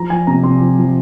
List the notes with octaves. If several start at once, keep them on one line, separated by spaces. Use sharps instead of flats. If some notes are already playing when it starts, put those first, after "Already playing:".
Already playing: F3 A#5
F3 G#5
C3 A#5
C3 C6
F3
F3